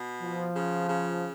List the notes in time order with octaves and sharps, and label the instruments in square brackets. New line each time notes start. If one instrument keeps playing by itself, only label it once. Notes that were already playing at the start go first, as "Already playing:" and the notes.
Already playing: [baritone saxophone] B2
[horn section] F3
[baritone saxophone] C#3
C#3